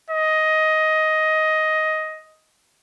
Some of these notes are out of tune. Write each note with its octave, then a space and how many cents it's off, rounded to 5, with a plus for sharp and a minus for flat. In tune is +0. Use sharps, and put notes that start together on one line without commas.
D#5 +10